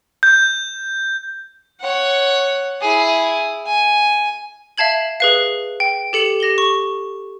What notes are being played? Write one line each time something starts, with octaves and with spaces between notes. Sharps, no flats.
G6
C#5 F#5
E4 G#4
G#5
E5 F5 A5 G#6 F#7
G#4 B4 F5
G5
G4 A4 C#7 E7 F#7
G4 A#6 F#7 G7
C#6